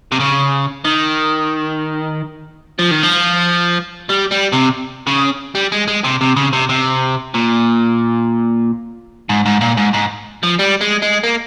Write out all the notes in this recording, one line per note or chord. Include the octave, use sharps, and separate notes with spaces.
C3
C#3
D#3
F3
D#3
F3
G3
G3
C3
C#3
G3
G#3
G#3
C3
C3
C#3
C3
C3
A#2
G#2
G#2
A#2
G#2
G#2
F3
G3
G#3
G#3
A#3